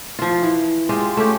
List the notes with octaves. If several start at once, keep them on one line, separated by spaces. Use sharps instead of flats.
F3 F4
E3
G#3 F4 G4
A3 C#4 G4